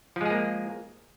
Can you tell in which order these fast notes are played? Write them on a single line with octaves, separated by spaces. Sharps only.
F3 G#3 G#4 A#3